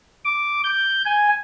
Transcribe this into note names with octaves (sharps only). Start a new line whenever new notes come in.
D6
G6
G#5